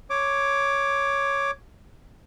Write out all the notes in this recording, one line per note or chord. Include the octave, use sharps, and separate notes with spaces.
C#5 D6